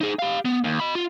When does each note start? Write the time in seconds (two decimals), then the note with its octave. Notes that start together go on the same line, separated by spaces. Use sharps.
0.01 D#4 G#4
0.19 G4 F5
0.45 B3
0.64 D#2
0.80 D#5 B5
0.95 F4